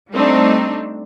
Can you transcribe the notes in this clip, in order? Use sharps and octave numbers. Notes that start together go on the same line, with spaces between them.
G3 A3 C4 D4 D#4